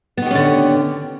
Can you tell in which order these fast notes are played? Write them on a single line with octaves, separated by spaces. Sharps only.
B3 D#3 G4 C#4 D3